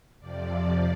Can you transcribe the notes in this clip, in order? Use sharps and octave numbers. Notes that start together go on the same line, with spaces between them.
F2 C3 F3 D5